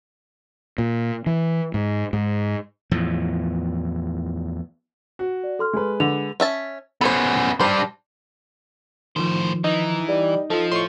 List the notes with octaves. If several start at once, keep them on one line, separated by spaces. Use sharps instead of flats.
A#2
E3
G#2
G#2
E2 A2 F3
F#4
D5
A4 C6 F6
G#3 B4
D3 F7
C#4 E5 A5
B3 C#4 A4 C5
G3 D4 C5
A2 D#3 F3 C5
E3 D#4
G3
F3 F4 A4 D#5
A2 C6 C#6